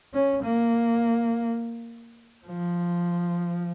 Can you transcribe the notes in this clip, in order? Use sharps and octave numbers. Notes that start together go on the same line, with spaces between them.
C#4
A#3
F3